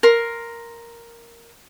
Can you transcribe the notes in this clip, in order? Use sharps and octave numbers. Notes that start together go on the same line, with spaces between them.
A#4 C6